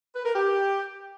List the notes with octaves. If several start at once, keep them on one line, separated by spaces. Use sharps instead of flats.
B4
A#4
G4